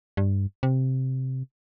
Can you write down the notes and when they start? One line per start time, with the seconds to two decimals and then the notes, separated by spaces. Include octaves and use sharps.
0.17 G2
0.63 C3